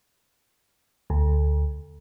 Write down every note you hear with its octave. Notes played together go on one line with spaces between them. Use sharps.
D2